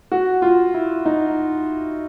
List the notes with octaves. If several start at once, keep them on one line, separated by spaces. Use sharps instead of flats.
F#4
F4
E4
D#4